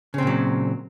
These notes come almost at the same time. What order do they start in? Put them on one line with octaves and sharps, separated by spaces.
C#3 C4 A#2 F#3